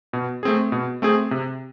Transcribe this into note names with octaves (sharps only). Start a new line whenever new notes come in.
B2
A3 C4 G#4
B2
A3 C4 G#4
C3